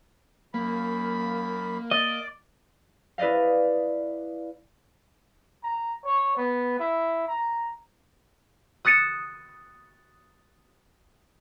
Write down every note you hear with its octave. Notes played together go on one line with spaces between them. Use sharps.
F#2 A#3 B5
D5 D#5
E4 B4 D5 D#5 F5
A#5
C#5
B3
E4
A#5
D#6 F#6 A6 C#7 D#7 E7